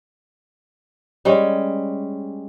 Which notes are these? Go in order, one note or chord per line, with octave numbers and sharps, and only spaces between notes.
G3 G#3 C#4